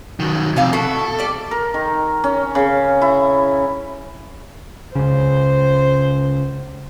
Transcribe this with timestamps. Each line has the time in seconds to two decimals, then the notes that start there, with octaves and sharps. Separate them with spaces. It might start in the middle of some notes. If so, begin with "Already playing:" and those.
0.20 D#3 F#3
0.56 F2 C3 F5 G#5
0.73 B2 E4 F#4 A4
1.19 G3 D5
1.51 A#4
1.74 D#3
2.24 C#4
2.55 C#3
3.02 E4
4.95 C#2 C#3 C5